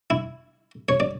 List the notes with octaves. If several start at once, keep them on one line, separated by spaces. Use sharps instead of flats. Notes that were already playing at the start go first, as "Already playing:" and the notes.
E4
C#5
D5